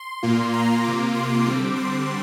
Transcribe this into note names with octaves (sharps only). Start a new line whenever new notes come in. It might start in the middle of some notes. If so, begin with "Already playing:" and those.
Already playing: C6
A#2 A#3 F4
A#5
C3 A#3 F4 D6
C6
D3 G3 C4 D6
C6